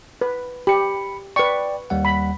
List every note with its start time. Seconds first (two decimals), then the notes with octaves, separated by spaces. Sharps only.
0.21 B4
0.67 G4 B5 C#7
1.36 B4 D5 G5 C#6
1.90 D#2 G3 F#5
2.05 B5